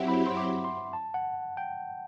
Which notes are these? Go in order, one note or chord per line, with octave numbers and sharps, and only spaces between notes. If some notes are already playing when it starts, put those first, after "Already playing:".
Already playing: F#3 C4 E4 G4 E5 F#5
B5
C6
D6
C6
A5
F#5
G5